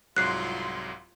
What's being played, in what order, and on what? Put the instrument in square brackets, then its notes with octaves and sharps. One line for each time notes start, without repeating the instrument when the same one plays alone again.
[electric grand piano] C2 G#2 F#3 [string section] F4 C6 [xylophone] F#6 C7